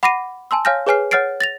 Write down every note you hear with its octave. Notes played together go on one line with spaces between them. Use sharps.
F#5 B5 D6 A#6 C7 D#7
G#5 A5 C6 E6
C#5 F5 G#5 F6 G6 A#6
G#4 B4 C#5 G#5 F6 C7
C#5 F#5 F6 A6 C7 D7
A6 A#6 F7